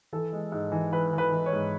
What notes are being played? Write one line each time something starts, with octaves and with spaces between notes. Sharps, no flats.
E3 A4
G#3
G#2
E3
E3 B4
E3
B4
E3
C#5
G#2